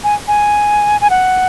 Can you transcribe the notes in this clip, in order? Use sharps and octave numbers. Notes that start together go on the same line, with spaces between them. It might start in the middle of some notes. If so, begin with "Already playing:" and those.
G#5
G#5
G#5
F#5